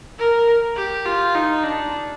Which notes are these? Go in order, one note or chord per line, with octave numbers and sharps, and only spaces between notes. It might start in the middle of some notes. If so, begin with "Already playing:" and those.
A#4
G4
F4
D#4
D4